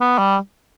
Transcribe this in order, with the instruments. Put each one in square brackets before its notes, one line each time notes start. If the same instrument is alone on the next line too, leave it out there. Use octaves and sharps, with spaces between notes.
[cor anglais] B3
G3